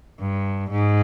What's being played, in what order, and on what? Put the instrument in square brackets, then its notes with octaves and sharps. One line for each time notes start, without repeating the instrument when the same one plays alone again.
[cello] G2
G#2